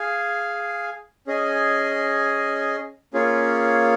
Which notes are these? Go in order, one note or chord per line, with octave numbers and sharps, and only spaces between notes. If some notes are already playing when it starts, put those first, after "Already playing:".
Already playing: G#4 F5 G#5
C#4 G#4 D#5 G#5
A#3 C#4 F4 G#4 C#5